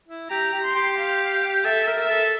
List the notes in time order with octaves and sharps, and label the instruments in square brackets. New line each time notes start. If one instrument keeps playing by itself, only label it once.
[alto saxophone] E4
[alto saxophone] G4 [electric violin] A#5
[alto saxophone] G4
[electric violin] C6
[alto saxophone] G4
[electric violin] F5
[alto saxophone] A4 [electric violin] E5
[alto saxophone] A#4
[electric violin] E5
[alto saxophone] A4